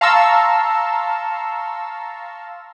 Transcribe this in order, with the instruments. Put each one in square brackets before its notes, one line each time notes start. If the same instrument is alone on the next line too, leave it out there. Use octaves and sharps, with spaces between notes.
[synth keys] F5 A5 A#5 C6 C#6 E6